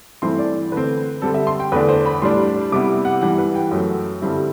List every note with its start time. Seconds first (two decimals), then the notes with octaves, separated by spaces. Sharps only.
0.22 G2 E3 A3 C4 E4 C6
0.38 D5
0.72 D3 A3 C4 B4
1.22 D3 G3 C4 A4
1.34 E5
1.47 C6
1.60 G5
1.72 E2 D3 A3 D4 B4
1.89 C5
2.06 B5
2.22 A2 G3 D4 C6
2.72 C3 G3 B3 E4 D6
3.05 F#5
3.21 G2 E3 G3 F#5
3.38 B4
3.55 G5
3.71 F#2 F#3 A3
4.22 G2 D3 G3 C4 E4